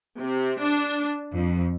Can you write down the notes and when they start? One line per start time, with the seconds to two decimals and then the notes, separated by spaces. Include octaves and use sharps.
0.20 C3
0.60 D4
1.33 F2